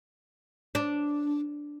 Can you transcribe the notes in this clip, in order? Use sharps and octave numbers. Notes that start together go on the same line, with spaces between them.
D4